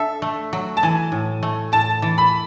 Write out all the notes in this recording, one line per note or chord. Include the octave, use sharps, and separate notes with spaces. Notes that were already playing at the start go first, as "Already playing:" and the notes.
Already playing: D4 A4 E5
A3
F#3
A5
E3 G#5
A2
A3
A2 A5
E3
B5